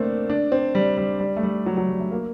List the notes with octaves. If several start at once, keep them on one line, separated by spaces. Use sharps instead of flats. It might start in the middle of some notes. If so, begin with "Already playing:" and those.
Already playing: A3 A#3 C4 D4
D4
C4
G3
G3
G3
A3
G3
F#3
F#3
G3
A3
A#3